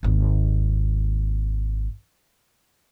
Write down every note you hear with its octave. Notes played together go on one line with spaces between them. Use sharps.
G#1 D#2